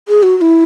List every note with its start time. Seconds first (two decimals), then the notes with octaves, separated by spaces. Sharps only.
0.08 G#4
0.23 F#4
0.38 F#4
0.41 E4